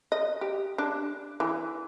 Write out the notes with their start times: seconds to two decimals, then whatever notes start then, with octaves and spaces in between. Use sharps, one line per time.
0.12 D#5
0.41 G4
0.78 D4
1.40 E3